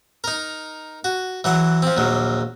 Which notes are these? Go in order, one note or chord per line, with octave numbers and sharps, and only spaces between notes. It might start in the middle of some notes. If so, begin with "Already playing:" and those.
D#4 A#4
F#4
E3 F#3 F#5
F3 C4
A#1 D#2 F#3